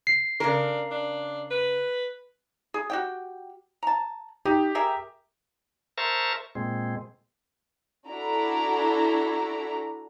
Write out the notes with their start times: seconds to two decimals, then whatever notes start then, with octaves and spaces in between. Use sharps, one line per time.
0.07 C7
0.40 C#3 D4 A#4
0.91 D4
1.51 B4
2.74 G#4
2.90 F#4 G4 G5
3.83 A5 A#5
4.45 D#4 G4
4.75 G#4 A#4 E5
5.98 A#4 C5 E5 A5 A#5 C#6
6.55 A#2 G#3 C4
8.08 D4 E4 F#4 A4 A#5